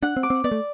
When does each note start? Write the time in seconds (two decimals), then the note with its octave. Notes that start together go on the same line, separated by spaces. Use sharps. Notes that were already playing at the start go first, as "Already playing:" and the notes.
0.03 D4 F#5
0.16 C4
0.23 D6
0.30 C4
0.44 B3 D5
0.51 A3